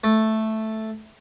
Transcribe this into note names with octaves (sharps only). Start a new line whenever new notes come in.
A3